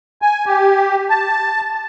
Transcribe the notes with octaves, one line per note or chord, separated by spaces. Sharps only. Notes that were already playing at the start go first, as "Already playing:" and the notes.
G#5
G4
A5